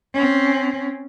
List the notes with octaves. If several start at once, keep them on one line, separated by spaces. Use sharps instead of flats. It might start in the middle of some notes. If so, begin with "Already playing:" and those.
C4 C#4